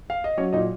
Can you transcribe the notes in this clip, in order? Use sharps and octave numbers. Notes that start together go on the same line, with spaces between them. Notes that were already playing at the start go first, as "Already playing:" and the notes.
F5
D#5
F#3 C#4 C#5
A#2 D#4 D#5